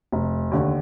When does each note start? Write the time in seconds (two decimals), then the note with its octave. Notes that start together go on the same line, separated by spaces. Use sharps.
0.12 F1
0.51 D#2 D3